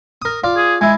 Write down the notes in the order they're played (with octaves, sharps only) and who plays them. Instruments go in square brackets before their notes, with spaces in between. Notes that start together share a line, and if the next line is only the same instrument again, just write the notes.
[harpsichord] A#4 D#6
F4 D5
[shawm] G#4
[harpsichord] G#3 E4 [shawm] G#5